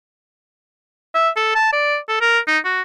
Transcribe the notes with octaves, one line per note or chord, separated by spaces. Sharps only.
E5
A4
A5
D5
A4
A#4
D#4
F#4